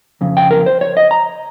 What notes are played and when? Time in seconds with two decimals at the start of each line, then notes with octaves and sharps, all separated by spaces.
0.21 F2 C#3
0.37 G5
0.51 A#4
0.66 C5
0.81 C#5
0.97 D#5
1.11 A#5